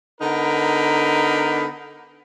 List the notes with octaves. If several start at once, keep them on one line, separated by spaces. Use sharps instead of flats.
D3 B3 D#4 A#4 B5